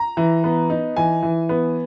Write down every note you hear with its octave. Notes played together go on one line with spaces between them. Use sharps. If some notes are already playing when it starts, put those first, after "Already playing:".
Already playing: A#5
E3
B3
D#4
E3 G#5
E3
B3